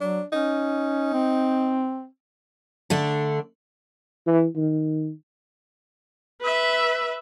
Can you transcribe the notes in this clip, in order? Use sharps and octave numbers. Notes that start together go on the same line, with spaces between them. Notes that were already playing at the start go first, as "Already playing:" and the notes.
F#3 D4
C#4 D#4
C4
D3 A3 D4
E3
D#3
B4 E5